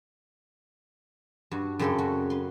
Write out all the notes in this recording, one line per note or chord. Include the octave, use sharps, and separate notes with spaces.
G2 F#4
F#2 C#3 C4 A4 G5 C6
F#4
B4 C6